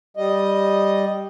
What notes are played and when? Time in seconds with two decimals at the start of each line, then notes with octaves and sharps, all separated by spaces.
0.17 G3 D#5